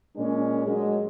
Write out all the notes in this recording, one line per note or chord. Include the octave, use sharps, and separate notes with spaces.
A#2 G#3 C#4 D4 A#4
F#3 G#3